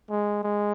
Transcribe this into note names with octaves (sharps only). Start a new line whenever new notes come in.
G#3
G#3